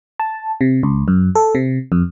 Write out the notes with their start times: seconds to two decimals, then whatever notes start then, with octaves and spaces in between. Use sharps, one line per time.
0.20 A5
0.61 C3
0.83 C#2
1.08 F#2
1.35 A4
1.55 C3
1.92 F2